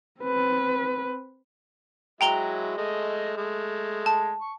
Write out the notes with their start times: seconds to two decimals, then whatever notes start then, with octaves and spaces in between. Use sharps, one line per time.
0.21 C4 B4
2.21 F#3 G#3 E4 G5 A#5 G7
2.77 G#3 A3 D#5
3.37 G#3 A3
4.06 A5
4.42 C#6